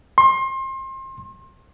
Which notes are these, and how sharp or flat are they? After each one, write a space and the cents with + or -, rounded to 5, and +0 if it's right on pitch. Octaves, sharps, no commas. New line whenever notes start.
C6 +30